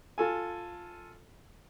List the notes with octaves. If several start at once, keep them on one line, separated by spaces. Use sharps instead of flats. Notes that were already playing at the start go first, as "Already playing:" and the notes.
F4 A4 G#5